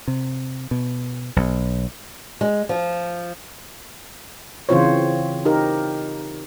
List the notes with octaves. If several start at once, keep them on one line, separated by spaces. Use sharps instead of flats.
C3
B2
B1
G#3
F3
C#3 E3 C4 F4 C5 C#5
D#4 G4 A#4